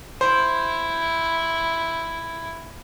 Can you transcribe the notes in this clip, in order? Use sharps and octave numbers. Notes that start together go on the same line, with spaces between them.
E4 C5